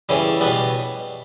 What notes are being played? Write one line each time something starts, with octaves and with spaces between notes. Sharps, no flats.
C#3 E3 G3
B2 G3 B3